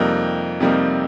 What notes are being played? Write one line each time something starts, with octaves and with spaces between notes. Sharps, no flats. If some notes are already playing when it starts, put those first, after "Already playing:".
Already playing: F2 C3 G3 A#3 D#4
F2 C3 G3 A#3 D#4